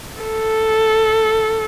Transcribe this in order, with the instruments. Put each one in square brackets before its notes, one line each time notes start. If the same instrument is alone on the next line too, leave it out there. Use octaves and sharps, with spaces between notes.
[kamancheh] A4